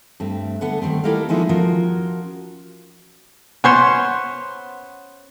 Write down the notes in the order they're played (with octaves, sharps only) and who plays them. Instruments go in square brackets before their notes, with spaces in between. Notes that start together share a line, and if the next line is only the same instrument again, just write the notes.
[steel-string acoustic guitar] G2 A3 C4
D3 B3 A4 F#5
D#3 G3 A3 C4
E4 G4 A4 A#4 D#5 F5
F3 G#3 A#3 B3 D#4 E4
F3 C#4 F4 F#4 A#4
[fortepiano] B3 C6 [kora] C#4 C5 C#5